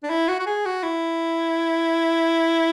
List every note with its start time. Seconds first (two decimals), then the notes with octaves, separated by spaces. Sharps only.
0.03 D4
0.10 E4
0.28 F#4
0.40 F#4
0.46 G#4
0.66 F#4
0.83 E4